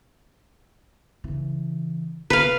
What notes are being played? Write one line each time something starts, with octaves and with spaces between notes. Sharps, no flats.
C#3 E3
C3 B4 F5